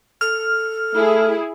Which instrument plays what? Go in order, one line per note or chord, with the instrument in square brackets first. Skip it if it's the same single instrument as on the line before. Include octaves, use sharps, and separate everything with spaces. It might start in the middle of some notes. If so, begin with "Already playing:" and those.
[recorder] A4 [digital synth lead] F6
[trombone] A3 [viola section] E4 G#4